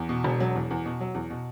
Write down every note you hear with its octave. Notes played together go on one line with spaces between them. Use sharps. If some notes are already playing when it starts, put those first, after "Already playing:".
Already playing: E2
B2
E1
F#3
E2
E2
B2
F#3
E2
B2